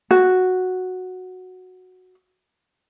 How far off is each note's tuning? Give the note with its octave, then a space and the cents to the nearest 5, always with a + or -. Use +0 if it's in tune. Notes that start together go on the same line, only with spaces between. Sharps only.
F#4 -5